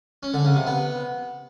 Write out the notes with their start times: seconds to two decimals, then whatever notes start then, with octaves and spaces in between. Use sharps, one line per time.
0.23 C#4
0.34 D3
0.45 C#3
0.56 C3
0.67 B3